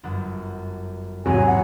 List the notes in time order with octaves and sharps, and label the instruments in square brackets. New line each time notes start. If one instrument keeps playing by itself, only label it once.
[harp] G1 F#2 F#5
[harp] A1 E2 G#2 [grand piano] C3 F#3 F#4 [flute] G#5
[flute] F#5